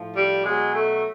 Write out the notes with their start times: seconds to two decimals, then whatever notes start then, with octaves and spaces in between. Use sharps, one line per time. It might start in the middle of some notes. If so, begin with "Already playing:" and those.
Already playing: A2 F3
0.16 G3
0.44 B2 F#3 G#3
0.75 A3